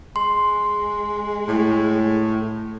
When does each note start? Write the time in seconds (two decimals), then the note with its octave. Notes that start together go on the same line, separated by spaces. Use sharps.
0.16 G#3 C6
1.48 A2